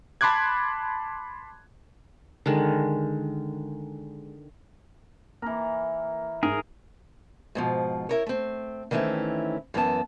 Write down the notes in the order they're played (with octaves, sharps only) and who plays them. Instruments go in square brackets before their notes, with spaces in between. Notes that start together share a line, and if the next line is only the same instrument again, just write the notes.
[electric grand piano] A5 B5 C6 D6 F#6 G#6
[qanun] D3 D#3 G#3
[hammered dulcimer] E3 A#4 [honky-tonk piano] A#3
[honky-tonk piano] G#2 [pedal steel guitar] G#4 A#4
[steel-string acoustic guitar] G#2 B2 F3
E4 A#4 C#5
A3 C4
D#3 E3 A3 C4 C#4 E4
F#2 E3 B3 G4 A5